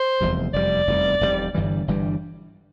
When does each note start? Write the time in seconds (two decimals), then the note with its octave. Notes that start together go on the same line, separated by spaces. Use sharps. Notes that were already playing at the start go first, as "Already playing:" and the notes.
Already playing: C5
0.20 F1 E2 C3 G3
0.53 F1 E2 C3 G3 D5
0.87 F1 E2 C3 G3
1.21 F1 E2 C3 G3
1.54 G1 G2 E3 G3
1.88 G1 G2 E3 G3